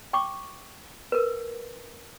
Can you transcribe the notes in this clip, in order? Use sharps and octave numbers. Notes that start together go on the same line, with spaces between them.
G5 C#6 D6
A#4 B4